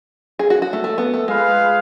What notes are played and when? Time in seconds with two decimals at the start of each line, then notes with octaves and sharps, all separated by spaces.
0.39 G#4
0.50 F#4
0.62 F#4
0.73 A3
0.84 A3
0.98 B3
1.14 A3
1.28 G#3 F4 G#4 B4 F5